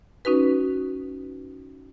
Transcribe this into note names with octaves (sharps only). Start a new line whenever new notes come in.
C#4 D#4 F#4 B4